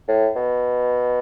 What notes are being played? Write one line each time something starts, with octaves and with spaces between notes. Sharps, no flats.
A2
B2